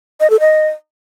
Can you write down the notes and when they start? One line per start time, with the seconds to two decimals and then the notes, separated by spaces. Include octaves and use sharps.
0.20 D#5
0.30 A4
0.40 D#5